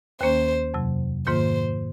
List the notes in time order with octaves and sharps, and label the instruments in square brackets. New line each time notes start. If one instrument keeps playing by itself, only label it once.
[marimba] D#2 D#3 A#3 C#4 [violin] C5
[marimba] F2 C3 F#3
[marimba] G#2 D#3 A#3 F4 [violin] C5